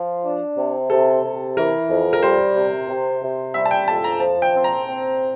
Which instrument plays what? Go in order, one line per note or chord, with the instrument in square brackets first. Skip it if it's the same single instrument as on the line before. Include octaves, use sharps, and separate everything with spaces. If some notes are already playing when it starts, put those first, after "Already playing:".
Already playing: [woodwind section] F3
D4
C3
[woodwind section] C3 [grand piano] A4
[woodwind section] C3
[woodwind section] E3 [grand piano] A#4
[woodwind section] F2
[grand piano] A#4
[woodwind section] G3 [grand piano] C5
[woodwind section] C3
C3
C3
[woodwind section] G3 [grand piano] E5
[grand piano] A5
G5
[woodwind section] F2 [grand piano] A5
[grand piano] A#5
[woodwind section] F3 [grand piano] A5
[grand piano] G5
[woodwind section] C4
[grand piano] A#5
[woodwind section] C4